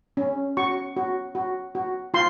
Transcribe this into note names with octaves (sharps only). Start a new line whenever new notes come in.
C#4
F#4 C#6
F#4
F#4
F#4
F4 C6